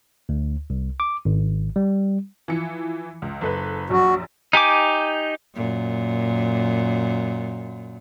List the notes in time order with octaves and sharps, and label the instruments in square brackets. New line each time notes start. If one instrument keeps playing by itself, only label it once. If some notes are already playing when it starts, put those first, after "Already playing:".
[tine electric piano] D2
C2
D6
G#1
G3
[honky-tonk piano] E3 F3 C#7
C#2
F#1 A4 B4
[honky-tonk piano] A#1 F#2 [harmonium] F#4
[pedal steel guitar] D#4 G4 G#5 D6
[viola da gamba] F#2 A#2